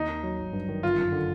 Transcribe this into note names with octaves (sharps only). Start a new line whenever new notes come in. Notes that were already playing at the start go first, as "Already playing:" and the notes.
Already playing: D#2 D#4
D#3
F#3
G#1
G2
D#3
G1 F4
F#2
D3